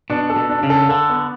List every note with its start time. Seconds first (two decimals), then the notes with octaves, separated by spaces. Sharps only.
0.10 B2 D4
0.30 A4
0.36 B2
0.49 D4
0.63 C#3
0.70 A4
0.89 D3 A4
1.10 B3